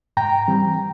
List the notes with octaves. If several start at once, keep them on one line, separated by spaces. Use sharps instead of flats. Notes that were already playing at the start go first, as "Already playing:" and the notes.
G#2 G5 A#5
E3 G3 C4